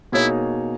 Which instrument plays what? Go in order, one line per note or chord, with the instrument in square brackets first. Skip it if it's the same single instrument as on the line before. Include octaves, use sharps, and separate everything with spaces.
[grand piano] B2 A#3 D#4 G#4 C#5 [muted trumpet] E4